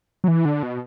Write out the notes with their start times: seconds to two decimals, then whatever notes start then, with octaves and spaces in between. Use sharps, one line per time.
0.24 F#3
0.28 E3
0.45 D3
0.63 B2